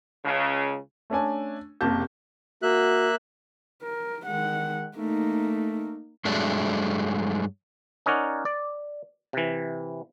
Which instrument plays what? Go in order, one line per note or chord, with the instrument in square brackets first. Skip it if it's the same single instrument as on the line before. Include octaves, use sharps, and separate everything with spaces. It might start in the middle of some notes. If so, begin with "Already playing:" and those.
[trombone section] C#2 C#3
[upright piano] A3 C#4 D4 G#5
F#1 C3 A#3 G4 A5 G6
[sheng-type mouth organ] A#3 E5 F#6 [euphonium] F#4
[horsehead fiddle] A#4
[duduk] D#3 [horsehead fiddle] G#3 F#5
[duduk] A3 [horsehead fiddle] A#3 D#4
[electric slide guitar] G2 F#3 G#3 A3 D4
[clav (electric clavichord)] C#4 D#4 A#4 C#5 D5 F#5
D5
C3 E3